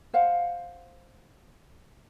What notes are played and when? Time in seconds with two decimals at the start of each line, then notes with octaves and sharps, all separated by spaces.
0.14 C5 F5 F#5